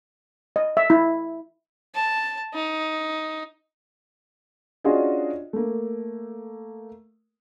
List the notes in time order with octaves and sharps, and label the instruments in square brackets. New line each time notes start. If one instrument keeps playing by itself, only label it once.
[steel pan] D#5
E5
E4
[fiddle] A5
D#4
[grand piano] C#4 D4 F4 F#4 G#4 D#5
A3 A#3